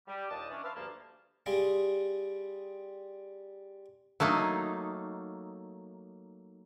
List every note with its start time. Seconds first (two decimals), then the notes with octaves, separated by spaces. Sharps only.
0.07 G3
0.29 D#2 A#2 D4 D#5 A5
0.50 E3 C#4 D4
0.63 B4 C5 E5 F5 A5 E6
0.75 D2 G2 F3 A#3 A5
1.46 G3 C4 G#4 D#5 F5
4.20 F#3 A3 A#3 D#4